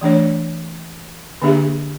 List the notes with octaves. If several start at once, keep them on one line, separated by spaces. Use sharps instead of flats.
E3 A3 D4 C#5
D3 A#3 D4 G4 G#4 E5